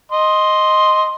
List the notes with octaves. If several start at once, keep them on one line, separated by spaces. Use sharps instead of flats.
D#5 C6